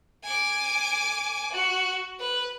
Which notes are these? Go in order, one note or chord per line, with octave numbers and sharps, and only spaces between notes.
G#5 D6
F#4
B4